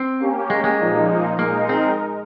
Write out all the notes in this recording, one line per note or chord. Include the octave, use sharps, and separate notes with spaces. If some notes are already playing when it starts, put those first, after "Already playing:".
Already playing: C4
A#3 C#4 G4
G#3
G#3
A#2 F3 A#3 D#4
G#3 A#3 D#4 A#4
C4